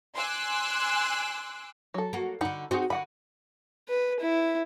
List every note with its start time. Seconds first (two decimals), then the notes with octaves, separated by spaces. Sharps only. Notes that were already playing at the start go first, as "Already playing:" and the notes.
0.16 G#5 C6 D6 E6 F#6
1.94 F#3 A4
2.13 A#3 F#4
2.41 D3 D#4 F#4 B5
2.71 C4 D#4 F#4 G#4
2.90 D3 F#4 F#5 B5
3.89 B4
4.20 E4